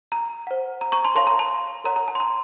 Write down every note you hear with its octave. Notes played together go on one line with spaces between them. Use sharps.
A#5
C5 F#5
A#5
A#5 C#6
A5 C6
A#4 C#5 F5 A5 C6
A#5
A5 C6
A#4 C#5 F#5 A#5
A#5
A5
C6
A#5